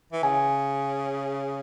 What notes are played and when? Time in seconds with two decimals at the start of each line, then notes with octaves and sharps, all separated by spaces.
0.13 E3
0.23 C#3 G#5